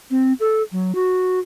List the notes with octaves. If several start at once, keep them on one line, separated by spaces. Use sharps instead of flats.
C4
A4
F#3
F#4